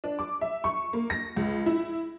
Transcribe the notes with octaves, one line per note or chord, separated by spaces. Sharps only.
D4
D6
E5
C#6
A#3
A#6
C#2
E4